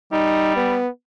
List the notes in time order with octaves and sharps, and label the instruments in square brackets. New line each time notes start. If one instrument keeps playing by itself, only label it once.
[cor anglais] G3 [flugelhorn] D#4
[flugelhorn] B3